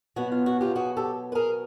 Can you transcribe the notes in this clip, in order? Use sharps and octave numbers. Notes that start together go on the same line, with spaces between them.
B2 F#3 B3 F#4
F4
F#4
F4 G4
F#4 G#4
G4 A4
B4
G#4 A#4